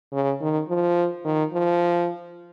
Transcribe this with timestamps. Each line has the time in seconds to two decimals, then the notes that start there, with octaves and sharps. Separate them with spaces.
0.12 C#3
0.41 D#3
0.69 F3
1.24 D#3
1.53 F3